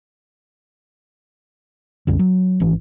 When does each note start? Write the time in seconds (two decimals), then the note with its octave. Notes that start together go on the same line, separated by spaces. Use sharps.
2.07 C2 F#2 D3
2.19 F#3
2.60 G#1 E3